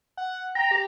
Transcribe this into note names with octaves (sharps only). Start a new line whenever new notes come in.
F#5
G5 A#5
G4